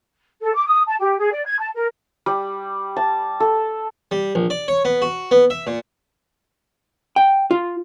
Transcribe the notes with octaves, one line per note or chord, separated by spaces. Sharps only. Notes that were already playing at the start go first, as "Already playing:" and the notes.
A4
D6
D#6
A5
G4
G#4
D5
G#6
A5
A#4
G3
A5
A4
G3
A#1
D5
C#5
B3
F#4
B3
E5
A#2
G5
F4